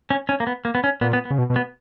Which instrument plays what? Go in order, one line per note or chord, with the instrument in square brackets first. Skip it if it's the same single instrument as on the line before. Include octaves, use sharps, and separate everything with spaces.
[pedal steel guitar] C#4
C#4
A#3
B3
A#3
B3
C#4
[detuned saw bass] A#2 [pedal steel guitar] B3
[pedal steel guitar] B3
B3
[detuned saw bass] C#3
B2
B2
[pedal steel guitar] B3